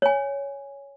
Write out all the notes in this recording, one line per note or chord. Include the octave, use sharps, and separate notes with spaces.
C#5 G#5